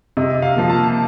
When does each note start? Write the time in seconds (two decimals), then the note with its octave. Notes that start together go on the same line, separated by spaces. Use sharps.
0.17 C3 D#5
0.42 F5
0.56 F3 A#3
0.70 A5